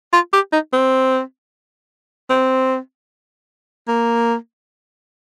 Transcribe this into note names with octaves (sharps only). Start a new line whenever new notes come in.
F4
G4
D#4
C4
C4
A#3